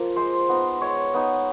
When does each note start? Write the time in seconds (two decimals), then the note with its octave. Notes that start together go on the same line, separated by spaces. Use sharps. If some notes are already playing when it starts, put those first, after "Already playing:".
Already playing: F3 A#3 F4 A#4
0.16 G#3 C5
0.49 B3 D#4
0.81 G#3 C#5
1.14 B3 D#4